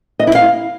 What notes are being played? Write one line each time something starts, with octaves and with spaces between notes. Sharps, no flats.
D#5
E4
F5